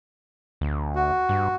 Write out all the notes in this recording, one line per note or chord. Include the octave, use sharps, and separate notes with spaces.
D2
F#4
G2